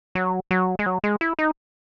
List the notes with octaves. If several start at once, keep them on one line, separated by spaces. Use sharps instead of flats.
F#3
F#3
G#3
F#3
G#3
E4
D#4